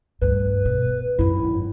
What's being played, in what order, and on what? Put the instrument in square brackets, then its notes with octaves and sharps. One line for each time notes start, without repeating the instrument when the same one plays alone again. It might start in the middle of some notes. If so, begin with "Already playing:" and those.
[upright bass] D2 G2 [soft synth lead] B4
[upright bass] B2
[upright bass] G#1 F#2 [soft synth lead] E4